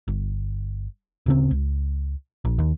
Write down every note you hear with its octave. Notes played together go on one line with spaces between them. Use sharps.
G1
D1 C#3 C4
C#2
A#1
D#2